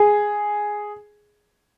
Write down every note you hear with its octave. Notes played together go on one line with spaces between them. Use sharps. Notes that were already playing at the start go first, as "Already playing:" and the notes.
Already playing: G#4